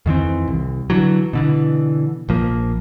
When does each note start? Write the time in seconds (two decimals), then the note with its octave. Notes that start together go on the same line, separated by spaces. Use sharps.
0.06 F2 D#3 E3 C4
0.48 C2
0.90 D3 E3 F#3
1.33 B2 D3 E3
2.29 A#1 F3 A#3